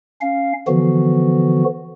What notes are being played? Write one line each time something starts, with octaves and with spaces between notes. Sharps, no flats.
C#4 F5
D3 E3 F3 B3 F#4